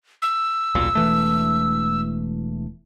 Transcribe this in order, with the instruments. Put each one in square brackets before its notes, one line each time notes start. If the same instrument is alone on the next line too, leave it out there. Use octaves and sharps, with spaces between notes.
[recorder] E6
[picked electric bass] D#1 B1 A#2
E1 E3 A3